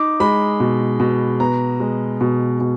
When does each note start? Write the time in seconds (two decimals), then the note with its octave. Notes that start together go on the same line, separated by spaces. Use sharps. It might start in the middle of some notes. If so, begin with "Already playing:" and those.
Already playing: D#4 D6
0.20 G#3 B5
0.60 B2
1.00 B2
1.40 B3 A#5
1.80 G#3
2.21 B2
2.60 B2